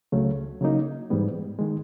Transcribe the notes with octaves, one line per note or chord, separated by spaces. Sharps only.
C#2 C#3 F#3 A3 C#4
C#3 F#3 A#3 D#4
G#2 E3 G3 B3
D#3 G#3